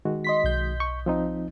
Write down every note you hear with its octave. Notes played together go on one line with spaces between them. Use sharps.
D#3 G#3 F#4
D#5 C6 B6
B1 G6
C#6
F3 C4 D#4